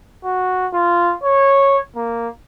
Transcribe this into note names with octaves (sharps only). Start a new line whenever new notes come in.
F#4
F4
C#5
A#3